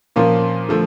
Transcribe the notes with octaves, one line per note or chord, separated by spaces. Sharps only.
A#2 F3 A#3 C#4 F4
D3 F3 A3